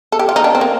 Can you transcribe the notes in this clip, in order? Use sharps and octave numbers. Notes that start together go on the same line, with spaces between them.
A4
G4
F4
D#4
D4
C4
A#3